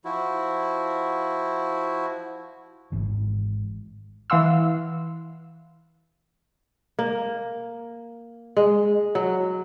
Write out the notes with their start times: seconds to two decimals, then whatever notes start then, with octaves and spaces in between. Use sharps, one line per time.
0.05 F3 E4 F#4
2.92 G#1 G#2 E3
4.30 E3 F5 F#5 C6 E6
6.99 A#3
8.57 G#3
9.15 F#3